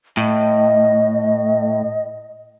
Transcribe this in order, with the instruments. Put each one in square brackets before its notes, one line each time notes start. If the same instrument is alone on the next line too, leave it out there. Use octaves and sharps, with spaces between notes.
[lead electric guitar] A2 [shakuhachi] D#5